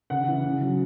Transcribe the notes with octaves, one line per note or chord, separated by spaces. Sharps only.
C#3 F#5
E3
C#3
F#3